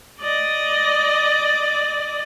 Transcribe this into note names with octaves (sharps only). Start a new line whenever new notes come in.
D5 D#5